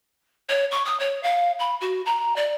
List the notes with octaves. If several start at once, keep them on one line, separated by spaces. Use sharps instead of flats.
C#5
C#6
D#6
C#5
F5
B5
F#4
A#5
D5